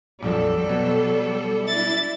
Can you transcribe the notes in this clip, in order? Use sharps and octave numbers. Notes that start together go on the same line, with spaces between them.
A#1 F2 F#3 G3 A4
B2
D4 E4 A6